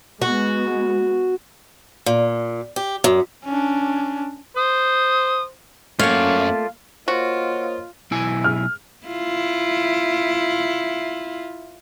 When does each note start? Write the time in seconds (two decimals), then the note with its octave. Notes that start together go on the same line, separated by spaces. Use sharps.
0.22 G#3 B3 F#4
2.06 A#2
2.76 G4
3.04 F#2
3.45 C#4 D4
4.56 C5 D#6
5.99 F#2 A3 A#3 F4 C#5 D5 F5
7.08 A#3 F4 F#4 C5 C#5 D#5
8.11 B1 E4 G#5
8.44 F6
9.07 E4 F4